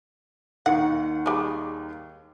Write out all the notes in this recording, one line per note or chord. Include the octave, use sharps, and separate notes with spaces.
D#2 D#3 F#5 C#7
G3 G#3